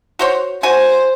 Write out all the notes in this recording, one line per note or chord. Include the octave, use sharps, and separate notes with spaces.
F#4 C5 C#5
F#4 C5 G#5